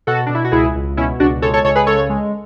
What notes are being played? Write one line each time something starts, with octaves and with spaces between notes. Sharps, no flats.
B2 F#4 A4
B2 D4
E4
F#4
C#2 E4 G#4
C#2
B2 C#4 E4
C#2 D4 F#4
G#3 A4 C#5
A4 C#5
C#2 A4 C#5
G#4 B4
C#3 A4 C#5
G#3